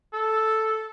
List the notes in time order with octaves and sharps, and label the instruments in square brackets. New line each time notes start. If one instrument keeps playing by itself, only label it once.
[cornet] A4